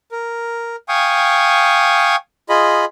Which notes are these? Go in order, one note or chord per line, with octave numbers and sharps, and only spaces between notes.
A#4
F5 G5 G#5 C#6 D#6
F4 G#4 D#5 B5